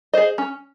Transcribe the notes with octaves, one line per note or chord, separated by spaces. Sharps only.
G#4 C5 D#5
C#4